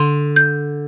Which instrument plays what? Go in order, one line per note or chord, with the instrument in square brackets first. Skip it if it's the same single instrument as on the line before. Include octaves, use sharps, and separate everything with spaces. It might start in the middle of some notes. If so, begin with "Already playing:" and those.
Already playing: [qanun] D3 [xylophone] C6
[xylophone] G6